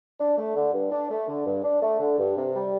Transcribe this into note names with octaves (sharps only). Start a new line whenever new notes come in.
D4
A3
D3
G2
D4
A3
D3
G2
D4
A3
D3
G2
C3
G3